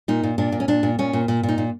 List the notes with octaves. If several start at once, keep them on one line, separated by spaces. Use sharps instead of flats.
A#2 D#4
A#2
A#2 D4
A#2
C#4
A#2 D4
A#2
A#2 C#4
A#2
A#2
A#2
D#4
A#2